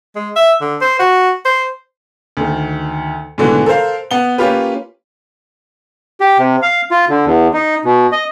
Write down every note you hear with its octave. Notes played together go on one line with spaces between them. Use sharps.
G#3
E5
D3
C5
F#4
C5
D2 D#3
G#2 B2 D3 E3 A3
A4 A#4 C5 F5
B3 G7
A#3 C#4 F4 G4 B4
G4
C3
F5
F4
D3
E2
D#4
B2
D#5